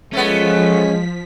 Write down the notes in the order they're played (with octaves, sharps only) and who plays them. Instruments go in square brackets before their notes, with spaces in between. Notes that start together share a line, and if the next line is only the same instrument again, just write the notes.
[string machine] F3 B6 [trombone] G#3 [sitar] A3 B3 [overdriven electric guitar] C#4